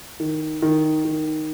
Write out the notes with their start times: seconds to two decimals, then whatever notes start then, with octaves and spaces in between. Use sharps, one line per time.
0.20 D#3
0.62 D#3
1.05 D#3